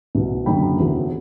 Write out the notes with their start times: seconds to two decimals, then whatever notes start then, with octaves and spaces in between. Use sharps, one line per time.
0.15 C2 B2
0.46 F#1 F#2 D3 G5 B5
0.77 E1 D2 C3 E3